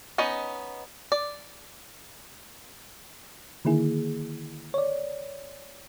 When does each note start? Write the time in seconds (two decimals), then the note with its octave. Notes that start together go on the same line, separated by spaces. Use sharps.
0.18 B3 C#4 D#4 D#5
1.12 D5
3.65 D3 D#3 A#3 E4 G#4
4.74 C#5 D5